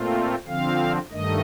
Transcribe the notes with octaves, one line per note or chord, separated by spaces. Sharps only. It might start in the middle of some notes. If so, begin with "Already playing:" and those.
Already playing: A#2 A3 C4 F4
D3 F3 C4 F5
G2 D#3 A3 D#5